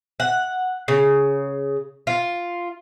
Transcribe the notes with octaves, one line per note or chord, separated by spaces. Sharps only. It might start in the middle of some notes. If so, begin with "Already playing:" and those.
F#5
C#3
F4